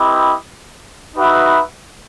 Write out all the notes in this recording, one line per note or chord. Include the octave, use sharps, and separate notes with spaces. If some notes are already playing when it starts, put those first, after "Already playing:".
Already playing: C4 E4 G4 B4 D#5
D#4 F#4 B4 E5